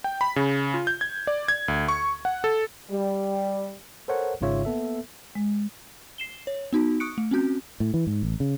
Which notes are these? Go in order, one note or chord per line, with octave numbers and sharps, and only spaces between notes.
G5
B5
C#3
F4
G6
G#6
D5
G#6
D2
C#6
F#5
A4
G3
A4 A#4 C5 C#5 F#5
G#1 G#2 C#3 F4 C#5 E5
A#3 B3 A4 E5
G#3
C7 E7 G7
C#5
B3 D#4 F#4
C#6 D#6 F#6 C#7 D7
A3
C4 C#4 F#4 G6
A2
E3
G#2
A1
C#3